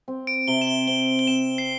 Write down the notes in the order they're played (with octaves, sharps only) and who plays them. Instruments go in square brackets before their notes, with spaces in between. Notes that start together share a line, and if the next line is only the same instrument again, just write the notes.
[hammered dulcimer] C4
[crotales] D7
[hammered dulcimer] C3 [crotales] G7
[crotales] E7
G7
[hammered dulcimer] C4 [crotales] G7
[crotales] G7
[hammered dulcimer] C4 [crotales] E7
[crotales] C7